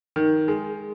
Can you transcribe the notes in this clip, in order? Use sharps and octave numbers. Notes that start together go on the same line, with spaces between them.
D#3
G#3